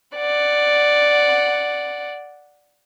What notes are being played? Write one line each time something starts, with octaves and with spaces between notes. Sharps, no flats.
D5 F#5